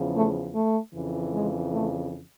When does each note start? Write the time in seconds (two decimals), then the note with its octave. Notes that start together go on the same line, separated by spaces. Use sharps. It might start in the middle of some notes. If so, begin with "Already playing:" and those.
Already playing: E2 C#3 F3
0.14 A3
0.54 A3
0.95 F2 C#3 E3
1.34 G#3
1.73 A3